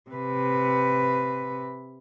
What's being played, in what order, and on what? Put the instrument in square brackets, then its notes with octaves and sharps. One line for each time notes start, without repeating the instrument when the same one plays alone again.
[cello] C3 B4